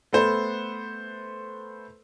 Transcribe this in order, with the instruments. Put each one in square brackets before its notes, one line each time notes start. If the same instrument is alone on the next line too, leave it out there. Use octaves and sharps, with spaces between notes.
[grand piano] A3 B3 A4 B4 C5